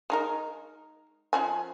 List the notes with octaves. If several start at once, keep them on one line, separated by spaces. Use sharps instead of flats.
G#3 D#4 A#4
F3 C#4 G#5